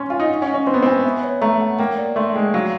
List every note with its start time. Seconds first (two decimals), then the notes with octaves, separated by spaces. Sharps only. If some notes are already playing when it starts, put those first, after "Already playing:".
Already playing: C#4 C6
0.10 F4 G#5
0.20 D#4
0.29 F#5
0.42 C#4
0.49 D#5
0.54 C#4
0.67 C4 C6
0.74 B3
0.83 C4 G#5
1.04 B3 E5
1.23 C#5
1.42 A3 A#5
1.61 F#5
1.79 A#3 G5
1.98 D5
2.16 A3 C6
2.35 G#3 G5
2.54 F#3 F5